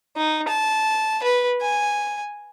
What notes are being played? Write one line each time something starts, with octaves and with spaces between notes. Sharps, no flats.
D#4
A5
B4
G#5